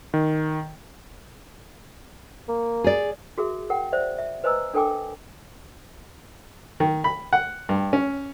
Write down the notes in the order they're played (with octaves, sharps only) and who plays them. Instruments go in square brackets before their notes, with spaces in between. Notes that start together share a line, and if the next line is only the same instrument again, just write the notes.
[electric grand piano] D#3
[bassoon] A#3
[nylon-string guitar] G#4 D5
[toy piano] F#4 G#4 A#4 E5
A#4 F#5 G5
C5 D5 E5
E5
B4 C5 D#5 G#5 A#5 E6
D4 A4 A#4 G5 G#5 D6
[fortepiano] D#3
B5
F#5
G2
C#4